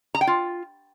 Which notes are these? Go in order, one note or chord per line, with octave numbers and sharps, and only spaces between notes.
A#5
G5
F4